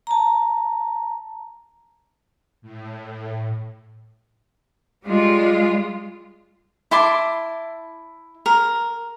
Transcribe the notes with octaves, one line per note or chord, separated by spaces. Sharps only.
A5 A#5
A2
G3 G#3 F4
E4 A5 C6 D6
A#4